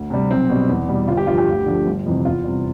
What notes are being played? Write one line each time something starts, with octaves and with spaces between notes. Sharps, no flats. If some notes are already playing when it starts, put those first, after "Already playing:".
Already playing: D2
C3 G3
B1 C4
B2 G3
E2
B2 G3
G1 F4
G4
G2 F3 F4
G4
D2
D3 F3 A3
G1
F2 C3 E3
E2 F4
C3 G3